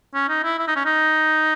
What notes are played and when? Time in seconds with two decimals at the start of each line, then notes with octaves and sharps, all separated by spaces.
0.14 C#4
0.29 D#4
0.44 E4
0.59 E4
0.68 D#4
0.76 C#4
0.86 D#4